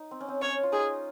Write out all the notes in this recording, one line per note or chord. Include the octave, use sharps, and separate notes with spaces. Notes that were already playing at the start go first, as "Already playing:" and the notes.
Already playing: D#4
C4
C#4
C4
C#4 C#5
F4
D#4 G#4